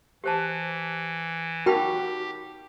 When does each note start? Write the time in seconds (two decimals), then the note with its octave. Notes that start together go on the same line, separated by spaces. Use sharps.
0.24 E3 G4 C5 A5
1.66 D#4 F#4 G4 A#4 G5 B5